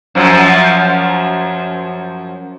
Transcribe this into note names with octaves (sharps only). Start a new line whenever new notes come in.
F#2 F3 F#3